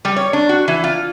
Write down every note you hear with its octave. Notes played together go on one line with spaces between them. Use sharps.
G3
C#5
D4
F#4
E3
F4